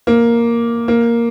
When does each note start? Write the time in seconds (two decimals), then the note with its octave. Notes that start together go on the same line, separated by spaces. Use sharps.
0.07 A#3
0.88 A#3